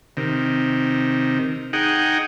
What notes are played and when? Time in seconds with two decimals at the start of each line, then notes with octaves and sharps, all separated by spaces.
0.17 C3 D#3
1.73 D#4 G#4 F#5 G5